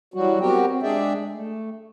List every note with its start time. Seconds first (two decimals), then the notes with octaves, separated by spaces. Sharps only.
0.14 E3 F#3 G3 F#4
0.41 B3 C4 F#4 G4 A#4 G5
0.70 C4
0.82 G#3 D4 G#4 D5 E5 G5
1.33 A3